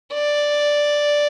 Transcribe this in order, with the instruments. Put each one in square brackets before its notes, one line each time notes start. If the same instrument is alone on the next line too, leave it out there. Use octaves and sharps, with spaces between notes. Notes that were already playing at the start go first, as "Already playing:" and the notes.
[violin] D5